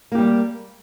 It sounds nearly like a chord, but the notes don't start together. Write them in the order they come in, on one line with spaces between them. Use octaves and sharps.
A#3 G4 G3